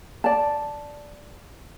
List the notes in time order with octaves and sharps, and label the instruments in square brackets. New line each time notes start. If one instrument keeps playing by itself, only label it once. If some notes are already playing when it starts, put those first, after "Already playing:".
[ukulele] D5 A5